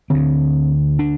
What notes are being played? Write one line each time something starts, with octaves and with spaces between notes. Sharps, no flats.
D2 D3 C4
D4